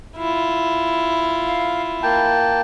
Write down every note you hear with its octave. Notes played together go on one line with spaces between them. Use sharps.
E4 F4
F5
A#3 G5 A5